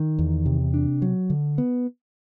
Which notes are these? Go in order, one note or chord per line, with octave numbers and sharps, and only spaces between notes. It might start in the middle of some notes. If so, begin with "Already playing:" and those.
Already playing: D#3
E2
C3
D4
F#3
D3
B3